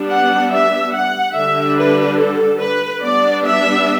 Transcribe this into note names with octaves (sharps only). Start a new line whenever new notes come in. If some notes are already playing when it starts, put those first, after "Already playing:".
Already playing: G3 B3 D4
F#5
E5
F#5
D3 G3 D4 E5
B4
A4
B4
G3 B3 D4 D5
E5